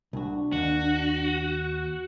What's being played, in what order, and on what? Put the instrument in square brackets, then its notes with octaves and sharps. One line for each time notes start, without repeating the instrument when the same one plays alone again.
[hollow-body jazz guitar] C2 F#4 [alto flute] D4
[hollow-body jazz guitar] D#2 [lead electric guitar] F#4